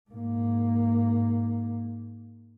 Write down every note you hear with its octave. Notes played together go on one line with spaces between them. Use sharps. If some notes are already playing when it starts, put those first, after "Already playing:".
G#2 A#3